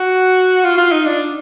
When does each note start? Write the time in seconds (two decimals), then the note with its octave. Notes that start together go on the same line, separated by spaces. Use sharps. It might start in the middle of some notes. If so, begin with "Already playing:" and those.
Already playing: F#4
0.64 F4
0.78 F4
0.92 D#4
1.06 D4